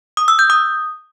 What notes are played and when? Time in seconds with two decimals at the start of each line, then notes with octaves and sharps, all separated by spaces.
0.17 D#6
0.28 E6
0.39 G6
0.50 D#6